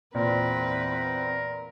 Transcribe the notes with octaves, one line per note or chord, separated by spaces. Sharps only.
E2 A#2 C4 A#4 B4